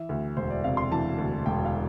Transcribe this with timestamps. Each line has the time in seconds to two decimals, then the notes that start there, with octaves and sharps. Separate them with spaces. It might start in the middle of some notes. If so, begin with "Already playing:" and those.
Already playing: E3 E5
0.09 D2
0.37 E1 C5
0.51 D5
0.64 C3 F5
0.77 C6
0.91 E3 A5
1.18 D2
1.46 E1 G5
1.65 F5